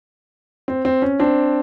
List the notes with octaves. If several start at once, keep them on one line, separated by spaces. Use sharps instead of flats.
C4
C4
C#4
C4 D4